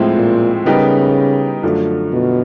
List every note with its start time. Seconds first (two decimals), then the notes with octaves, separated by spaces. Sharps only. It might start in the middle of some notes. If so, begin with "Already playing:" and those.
Already playing: A2 F3 G#3 C4 E4
0.16 A#2
0.65 C#3 G3 B3 D#4 G4 A#4
1.63 F#2 D3 F3 A3
2.12 B2